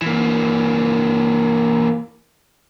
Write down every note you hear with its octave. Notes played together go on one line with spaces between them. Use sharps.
E3 A#3